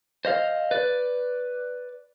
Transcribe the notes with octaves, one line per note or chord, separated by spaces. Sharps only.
C5 D#5 F5
B4 D5